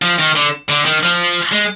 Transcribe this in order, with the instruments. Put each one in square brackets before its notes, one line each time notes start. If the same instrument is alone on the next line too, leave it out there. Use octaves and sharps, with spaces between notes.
[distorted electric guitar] F3
D#3
D3
D3
D#3
F3
G#3